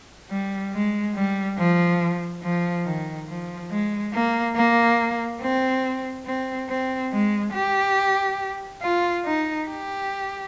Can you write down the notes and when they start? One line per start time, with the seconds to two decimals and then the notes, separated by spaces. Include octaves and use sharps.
0.30 G3
0.72 G#3
1.15 G3
1.58 F3
2.43 F3
2.85 D#3
3.28 F3
3.71 G#3
4.13 A#3
4.56 A#3
5.42 C4
6.26 C4
6.69 C4
7.12 G#3
7.54 G4
8.82 F4
9.25 D#4
9.68 G4